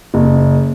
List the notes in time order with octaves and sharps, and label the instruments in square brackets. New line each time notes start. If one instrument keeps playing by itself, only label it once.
[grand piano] F#1